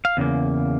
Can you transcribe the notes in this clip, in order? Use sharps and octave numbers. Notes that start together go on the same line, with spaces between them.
F5
E2 C#3 A#3